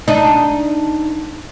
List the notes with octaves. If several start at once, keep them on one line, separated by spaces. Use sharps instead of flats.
D4 D#4